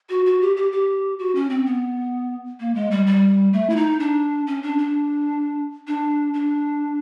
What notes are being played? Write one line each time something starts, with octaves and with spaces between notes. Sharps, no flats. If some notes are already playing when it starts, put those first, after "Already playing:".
F#4
F#4
G4
G4
G4
F#4
C#4
C4
B3
A#3
G#3
G3
G3
A3
E4
D#4
D4
C#4
D4
D4
D4
D4